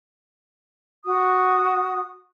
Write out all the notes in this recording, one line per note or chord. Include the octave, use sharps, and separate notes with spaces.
F#4 D#6